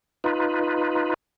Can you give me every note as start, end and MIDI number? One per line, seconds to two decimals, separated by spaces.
0.24 1.14 63
0.24 1.14 65
0.24 1.14 71